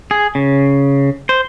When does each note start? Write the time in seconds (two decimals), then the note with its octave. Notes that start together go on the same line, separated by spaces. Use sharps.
0.11 G#4
0.35 C#3
1.29 C5